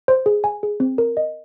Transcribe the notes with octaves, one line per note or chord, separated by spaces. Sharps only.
C5
G#4
G#5
G#4
C4
A#4
D#5